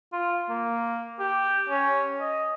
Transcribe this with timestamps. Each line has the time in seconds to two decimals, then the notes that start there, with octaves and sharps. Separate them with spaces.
0.13 F4
0.49 A#3
1.19 G4
1.69 C#4
2.20 D#5